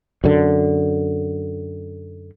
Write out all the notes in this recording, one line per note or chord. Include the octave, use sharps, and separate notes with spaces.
F#2 D3